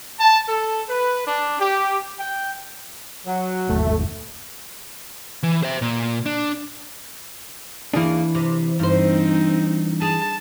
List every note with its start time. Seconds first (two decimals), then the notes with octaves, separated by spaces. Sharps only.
0.19 A5
0.49 A4
0.89 B4
1.27 D4
1.60 G4
2.19 G5
3.26 F#3
3.69 G1 D#2 A3
5.43 E3
5.63 C5 E5
5.82 A#2
6.26 D4
7.93 D#2 E3 A#3 D4 G#4
8.35 C3
8.79 G2 C4 D#4 C5
10.02 G#4 A5